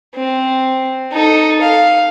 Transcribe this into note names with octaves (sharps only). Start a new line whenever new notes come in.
C4
D#4 A4
F5